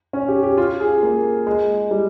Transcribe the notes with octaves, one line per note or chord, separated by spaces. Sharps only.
C#4
G4
G4
F4
G#4
A#3
G#3
G3